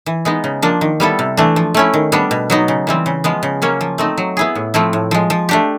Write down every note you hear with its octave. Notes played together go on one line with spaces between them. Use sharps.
E3
G#3 B3 D#4
C#3
F3 A#3 D4
D#3
G3 B3 E4 A4
C3
E3 A3 D4
F3
A3 C#4 E4
D#3
G3 B3 D4
B2
F#3 B3 D#4
C#3
E3 G3 C4
C#3
F3 G#3 B3
C#3
F#3 A#3 C#4
F3
A3 C4 D#4
F#3
B3 E4 G#4
A2
F3 A3 C4 E4
A2
F3 G#3
F3
A3 D4 G4